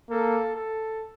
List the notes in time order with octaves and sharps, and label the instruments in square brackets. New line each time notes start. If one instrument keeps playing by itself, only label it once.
[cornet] A#3 [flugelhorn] A4
[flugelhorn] A4